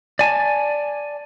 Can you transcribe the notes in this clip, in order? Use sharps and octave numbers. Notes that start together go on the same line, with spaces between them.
D5 G#5 A5